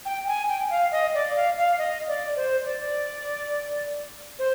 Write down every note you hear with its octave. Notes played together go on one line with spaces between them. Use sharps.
G5
G#5
G5
F5
D#5
D5
F5
F5
D#5
D5
C5
D5
C5